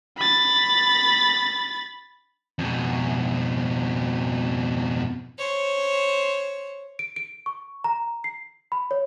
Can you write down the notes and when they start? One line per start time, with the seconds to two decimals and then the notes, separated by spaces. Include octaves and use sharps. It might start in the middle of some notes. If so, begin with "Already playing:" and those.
0.18 B5 A6
2.59 F2 B2
5.39 C5 C#5
6.99 D7
7.16 D7
7.46 C#6
7.84 A#5
8.24 C7
8.72 B5
8.91 C#5